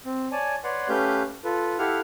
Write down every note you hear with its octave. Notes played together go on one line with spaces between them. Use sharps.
C4
C#5 D5 G#5 A5
B4 C#5 D5 F#5 C6
A3 C#4 G4 B4 F5 G6
F4 A4 B4
E4 G4 A4 F5 F#5 F6